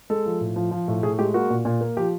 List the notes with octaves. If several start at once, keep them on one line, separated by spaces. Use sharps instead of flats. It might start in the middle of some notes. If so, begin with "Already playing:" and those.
G#3 A4
F3
A2
F3
F3
A2
A2 G#4
G#3 G4
A#3 F#4
A#2
A#2
A#3
F3 G4